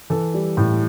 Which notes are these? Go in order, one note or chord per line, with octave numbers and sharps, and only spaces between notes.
E3 A4
G3
A2